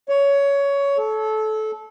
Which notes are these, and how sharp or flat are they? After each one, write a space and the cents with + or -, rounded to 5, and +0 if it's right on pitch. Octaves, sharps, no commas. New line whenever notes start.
C#5 +15
A4 -20